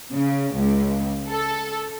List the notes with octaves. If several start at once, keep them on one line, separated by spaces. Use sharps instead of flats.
C#3
C#2
A4